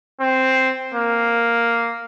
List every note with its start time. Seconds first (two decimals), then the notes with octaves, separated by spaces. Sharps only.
0.21 C4
0.94 A#3